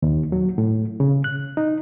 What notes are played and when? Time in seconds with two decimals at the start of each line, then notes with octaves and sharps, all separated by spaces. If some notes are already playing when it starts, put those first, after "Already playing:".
0.02 D#2
0.32 F#3
0.58 A2
1.00 C#3
1.24 F#6
1.57 D#4